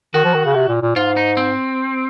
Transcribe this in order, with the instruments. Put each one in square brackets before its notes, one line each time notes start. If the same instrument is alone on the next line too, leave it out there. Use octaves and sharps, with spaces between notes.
[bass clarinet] D#3 [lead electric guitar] F#4
[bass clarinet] F3
D#3
C#3
C3
A#2
A#2
[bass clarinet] G#2 [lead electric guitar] F4
[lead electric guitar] D#4
C4